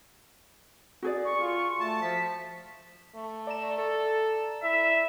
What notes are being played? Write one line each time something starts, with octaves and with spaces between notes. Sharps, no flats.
F#4 G#4 D5
C#6
F4
A3 A5
F3 B6
A3
D5 A#5 E7
A4
E4 E5